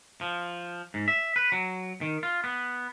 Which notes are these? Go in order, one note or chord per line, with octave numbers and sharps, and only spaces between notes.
F3
G#2
E5
B4
F#3
D#3
F4
B3